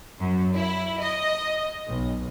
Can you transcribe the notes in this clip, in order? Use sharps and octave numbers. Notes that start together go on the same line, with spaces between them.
F#2
E4
D#5
B1